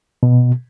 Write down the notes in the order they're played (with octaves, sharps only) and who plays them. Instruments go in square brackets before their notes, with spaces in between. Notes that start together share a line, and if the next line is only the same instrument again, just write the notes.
[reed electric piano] B2